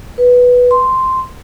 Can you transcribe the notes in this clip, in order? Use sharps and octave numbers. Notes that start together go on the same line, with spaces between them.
B4
C6